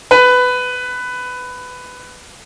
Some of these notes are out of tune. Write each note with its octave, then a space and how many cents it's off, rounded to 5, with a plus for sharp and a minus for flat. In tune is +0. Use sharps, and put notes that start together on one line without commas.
B4 +15